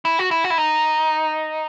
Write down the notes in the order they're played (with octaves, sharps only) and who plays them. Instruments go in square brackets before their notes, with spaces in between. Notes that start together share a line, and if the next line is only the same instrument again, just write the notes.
[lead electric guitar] E4
F#4
E4
F#4
E4
D#4